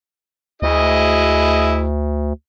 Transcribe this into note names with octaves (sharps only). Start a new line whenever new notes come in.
D2 E4 G#4 D#5